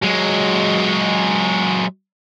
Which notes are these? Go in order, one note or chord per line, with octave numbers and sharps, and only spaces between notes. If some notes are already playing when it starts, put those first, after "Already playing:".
F#3 G#3